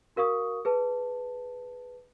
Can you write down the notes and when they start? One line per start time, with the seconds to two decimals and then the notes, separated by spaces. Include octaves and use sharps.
0.16 F#4 A#4 F5 C#6 D#6
0.65 G#4 B4 A5